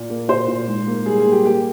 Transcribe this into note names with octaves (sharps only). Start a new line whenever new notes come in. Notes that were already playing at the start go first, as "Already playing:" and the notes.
Already playing: A#2
A#3
A#2 C5
A#2
G#2
A#3
G3 G#4
G#4
A#3
G4
A#3 G4